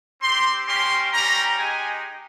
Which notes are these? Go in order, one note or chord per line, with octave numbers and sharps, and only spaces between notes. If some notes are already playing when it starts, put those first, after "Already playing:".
C4 G4 C6
A#3 C#4 G4 C6
G3 C#4 G4 A#5
G#3 D#4 G4 G#5